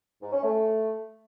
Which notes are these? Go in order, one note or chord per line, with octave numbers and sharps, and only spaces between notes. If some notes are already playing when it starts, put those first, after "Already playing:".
G#2
C#4
A3